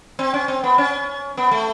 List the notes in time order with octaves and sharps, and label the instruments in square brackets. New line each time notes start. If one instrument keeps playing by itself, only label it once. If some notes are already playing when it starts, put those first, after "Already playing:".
[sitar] C4
C#4
C4
B3
C#4
B3
A3